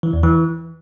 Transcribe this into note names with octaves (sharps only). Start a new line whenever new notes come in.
E3
E2
E3